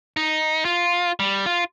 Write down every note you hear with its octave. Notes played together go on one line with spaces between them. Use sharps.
D#4
F4
G3
F4